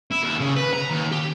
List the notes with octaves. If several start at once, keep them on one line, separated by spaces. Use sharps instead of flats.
E4
D#2
C#3
B4
A#5
D#2
G4